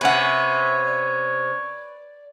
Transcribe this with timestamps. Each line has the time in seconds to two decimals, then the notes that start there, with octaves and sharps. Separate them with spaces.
0.01 C3 C#4 B4 C#5 E5 F#5
0.87 D5